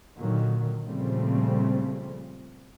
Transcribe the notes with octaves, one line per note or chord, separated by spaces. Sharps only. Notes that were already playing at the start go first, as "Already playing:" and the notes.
A#2 D3 D#3 F#3
A#2 C#3 F3 G3 A3 C4